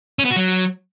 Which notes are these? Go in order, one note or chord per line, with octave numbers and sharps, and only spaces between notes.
C#4
B3
F#4
F#3